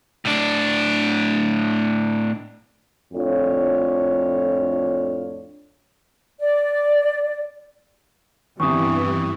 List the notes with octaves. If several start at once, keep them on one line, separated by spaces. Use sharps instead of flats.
A2 D4
F2 A2 D4 F4 A4 C#5
D5
E2 G2 C3 E3 C#6 D#6